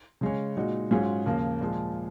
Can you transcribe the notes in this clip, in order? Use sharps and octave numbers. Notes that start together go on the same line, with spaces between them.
C#3 G#3 C#4
A#2 G#3 D#4 F#4
G#2 F#3 C#4 F4 G#4
D#2 C#3 F3 A#3
A#2 F3 G#3